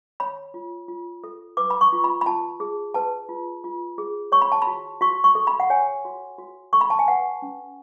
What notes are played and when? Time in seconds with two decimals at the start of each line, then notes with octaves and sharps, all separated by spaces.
0.20 C#5 B5
0.54 F4
0.88 F4
1.24 A4
1.57 B4 D6
1.70 B5
1.81 C#6
1.93 F4
2.04 B5
2.21 B5
2.26 F4 A5
2.60 G#4
2.94 B4 A5
3.29 F4
3.64 F4
3.98 G#4
4.32 C#5 C#6
4.42 B5
4.52 A5
4.62 B5
4.67 F#4
5.01 F#4 C#6
5.24 C#6
5.35 A4
5.47 B5
5.60 F#5
5.70 C#5 G#5
6.05 F#4
6.38 F#4
6.73 A4 C#6
6.81 B5
6.90 A5
6.99 G#5
7.08 B4 F#5
7.42 C#4